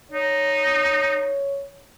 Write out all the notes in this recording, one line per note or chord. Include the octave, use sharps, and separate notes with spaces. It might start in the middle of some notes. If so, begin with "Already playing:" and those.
D#4 C#5